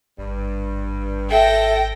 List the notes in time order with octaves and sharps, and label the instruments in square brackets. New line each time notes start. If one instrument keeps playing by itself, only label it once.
[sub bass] G#1 [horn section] G2
[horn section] A4 [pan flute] E5 [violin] G5 A#6